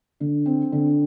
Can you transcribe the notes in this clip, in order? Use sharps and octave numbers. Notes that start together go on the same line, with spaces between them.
D3
C4
D3